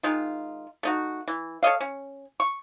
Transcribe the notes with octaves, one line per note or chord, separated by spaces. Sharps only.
D#3 G#3 D#4 F4
A3 D#4 F#4
E3
A4 C#5 D#5 F5
C#4
C#6